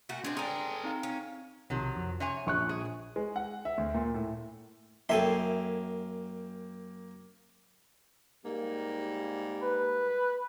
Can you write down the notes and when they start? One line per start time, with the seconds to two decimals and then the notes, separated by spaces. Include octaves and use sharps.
0.09 A#2 A3 F#4
0.24 G#3 C4 D4
0.37 D4 G#4 A4 G5 A#5 C6
0.84 C4 D#4 F5
1.03 C#4
1.70 B1 C3 D#3 F3 F#3
1.96 F2
2.20 C3 C#4 C#5 G#5
2.46 A#1 C#6 F#6
2.69 G#4
3.16 G#3
3.36 F#5
3.65 E5
3.78 D2
3.94 A#2
4.14 A2
5.09 F#2 A#3 G#4 A4 E5 G5 G#5 C6
8.45 G#2 G3 A#3
9.63 B4